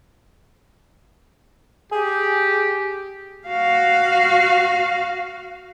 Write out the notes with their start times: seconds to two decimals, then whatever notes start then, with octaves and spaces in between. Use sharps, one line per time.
1.92 G4 G#4
3.48 F#4 F5